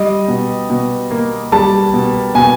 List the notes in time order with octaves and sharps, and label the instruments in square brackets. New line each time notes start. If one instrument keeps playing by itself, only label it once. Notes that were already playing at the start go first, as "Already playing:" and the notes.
Already playing: [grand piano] G3 D#5
B2
B2
A#3
G3 A5
B2
B2 G#5